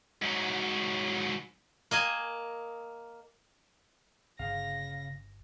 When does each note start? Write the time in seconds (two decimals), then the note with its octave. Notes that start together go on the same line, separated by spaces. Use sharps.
0.22 G#2 F#3
1.91 A#3 D#5 G#5
4.39 G1 C#3 F5 A#6